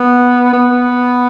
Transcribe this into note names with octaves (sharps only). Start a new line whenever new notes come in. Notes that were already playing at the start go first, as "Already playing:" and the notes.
Already playing: B3
B3